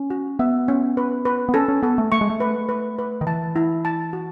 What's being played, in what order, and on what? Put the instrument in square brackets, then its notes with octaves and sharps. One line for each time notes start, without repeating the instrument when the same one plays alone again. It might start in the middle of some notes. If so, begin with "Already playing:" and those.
Already playing: [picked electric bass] C#4
[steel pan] F#4
[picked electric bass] B3 [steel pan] E5
[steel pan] C#4
B4
B4
[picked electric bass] B3
[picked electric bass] C#4 [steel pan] A4
[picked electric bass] C#4
[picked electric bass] B3 [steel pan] A4
[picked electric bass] A3
[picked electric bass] A3 [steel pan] C#6
[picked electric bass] G#3
A3
[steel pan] B4
B4
B4
[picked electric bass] D#3
[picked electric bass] E3 [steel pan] A5
[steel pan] E4
A5
F#4